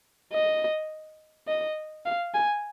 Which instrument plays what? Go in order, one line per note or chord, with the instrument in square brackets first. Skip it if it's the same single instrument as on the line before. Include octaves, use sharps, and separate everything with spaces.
[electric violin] D#5
D#5
F5
G#5